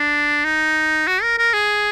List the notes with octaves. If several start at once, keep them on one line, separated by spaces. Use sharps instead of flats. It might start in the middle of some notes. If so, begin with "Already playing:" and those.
Already playing: D4
D#4
F#4
A#4
A#4
G#4